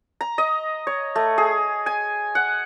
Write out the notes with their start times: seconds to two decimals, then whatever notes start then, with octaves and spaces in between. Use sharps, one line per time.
0.21 A#5
0.38 D#5
0.87 C#5
1.16 A3
1.38 G#4
1.86 G#5
2.35 F#5